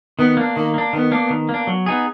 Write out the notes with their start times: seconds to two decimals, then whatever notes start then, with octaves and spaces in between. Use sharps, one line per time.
0.19 D#3 B3
0.37 A#3 D4
0.56 D#3 A#3
0.74 A#3 D4
0.93 D#3 B3
1.12 A#3 D4
1.30 D#3
1.49 A#3
1.54 D4
1.67 F#3
1.86 B3 D#4 G#4